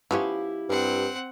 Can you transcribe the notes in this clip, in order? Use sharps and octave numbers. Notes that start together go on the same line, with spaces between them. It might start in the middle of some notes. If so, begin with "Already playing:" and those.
F3 B3 C#4 E4 G4 F5
G2 C4 F#5